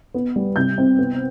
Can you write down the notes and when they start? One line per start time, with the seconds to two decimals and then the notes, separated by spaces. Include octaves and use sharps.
0.14 B3
0.36 G3
0.56 C3 G6
0.78 C4
0.99 B3